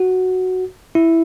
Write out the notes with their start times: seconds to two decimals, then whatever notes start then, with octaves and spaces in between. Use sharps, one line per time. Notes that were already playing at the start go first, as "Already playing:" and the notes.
Already playing: F#4
0.95 E4